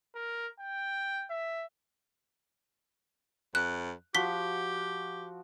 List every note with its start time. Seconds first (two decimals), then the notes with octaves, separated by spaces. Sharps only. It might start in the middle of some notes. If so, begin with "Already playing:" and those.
0.15 A#4
0.60 G5
1.30 E5
3.55 F2 F#6
4.15 F3 F#4 G4 B6 G7